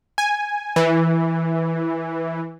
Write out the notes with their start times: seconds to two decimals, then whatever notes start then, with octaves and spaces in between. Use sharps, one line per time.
0.18 G#5
0.76 E3